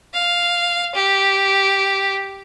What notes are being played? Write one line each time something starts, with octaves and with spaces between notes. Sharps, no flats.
F5
G4